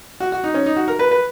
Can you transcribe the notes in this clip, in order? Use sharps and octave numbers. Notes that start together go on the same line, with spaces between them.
F#4
F#4
D#4
C#4
D#4
F#4
A#4
B4
B4